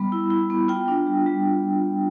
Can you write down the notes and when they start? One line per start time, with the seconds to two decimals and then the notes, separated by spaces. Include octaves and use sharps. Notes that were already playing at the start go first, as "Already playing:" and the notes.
Already playing: G3 B3 B5
0.12 E4
0.30 E4
0.50 B3
0.68 F4 G5
0.88 D4
1.07 G3
1.26 G3